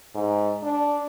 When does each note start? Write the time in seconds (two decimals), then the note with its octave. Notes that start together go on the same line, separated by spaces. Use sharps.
0.15 G#2
0.63 D4